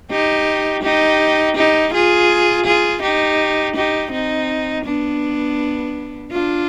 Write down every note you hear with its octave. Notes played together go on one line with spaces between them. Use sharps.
D#4 G4
D#4 G4
D#4 G4
F4 G#4
F4 G#4
D#4 G4
D#4 G4
C4 D#4
B3 D4
D4 F4